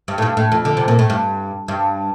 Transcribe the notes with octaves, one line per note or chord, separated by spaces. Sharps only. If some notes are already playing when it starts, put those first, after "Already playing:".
G2
A2
G2
A2
F2
D3
C3
A#2
A2
G2
G2